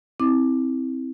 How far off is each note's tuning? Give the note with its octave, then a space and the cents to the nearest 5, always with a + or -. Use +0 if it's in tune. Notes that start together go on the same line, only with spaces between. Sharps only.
C4 +0 E4 -20 D6 +10